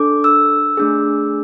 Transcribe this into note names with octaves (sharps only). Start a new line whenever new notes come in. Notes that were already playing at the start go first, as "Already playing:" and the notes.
Already playing: D4 A4 D6
E6
A3 D4 G#4